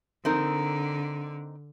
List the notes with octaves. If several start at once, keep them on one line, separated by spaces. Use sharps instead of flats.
D3 C4 D#4 A#4